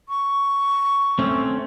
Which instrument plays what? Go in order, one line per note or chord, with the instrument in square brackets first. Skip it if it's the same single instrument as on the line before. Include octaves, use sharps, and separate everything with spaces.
[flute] C#6
[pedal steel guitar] A3 C4 C#4